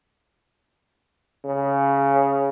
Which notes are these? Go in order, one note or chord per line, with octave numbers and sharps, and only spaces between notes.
C#3